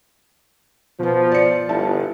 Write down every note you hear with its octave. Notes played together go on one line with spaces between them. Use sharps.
B2 F3 B3
D5 C#7
G1 E4 A5